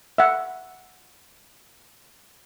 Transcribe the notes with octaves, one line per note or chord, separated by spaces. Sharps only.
E5 F#5